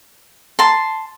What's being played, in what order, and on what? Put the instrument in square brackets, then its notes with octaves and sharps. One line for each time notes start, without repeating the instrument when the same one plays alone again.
[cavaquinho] A5 C6